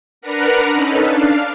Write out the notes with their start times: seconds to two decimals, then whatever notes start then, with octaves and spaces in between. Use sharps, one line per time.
0.22 D4 A#4 B4 F#5 A#5
0.72 C#4 D#4 A4 B4
1.07 D4 F5